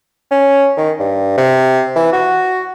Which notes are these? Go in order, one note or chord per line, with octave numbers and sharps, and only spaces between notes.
C#4
D#3
G2
C3
E3
F#4